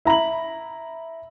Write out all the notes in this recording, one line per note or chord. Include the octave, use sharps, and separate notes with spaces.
E4 A#5 B5 F#7